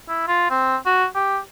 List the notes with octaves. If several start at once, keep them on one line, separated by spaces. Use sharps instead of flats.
E4
F4
C4
F#4
G4